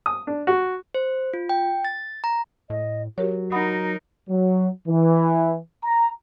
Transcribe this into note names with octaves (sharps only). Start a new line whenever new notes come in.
D#6
D4
F#4
C5
F4
G5
A6
A#5
A2 D#5
F#3 F#4 G4 A#4 C#5
D#4 A#4 F#5 B5 D#6
F#3
E3
A#5